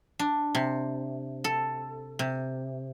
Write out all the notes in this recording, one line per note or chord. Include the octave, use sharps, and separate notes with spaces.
D4
C3
A4
C3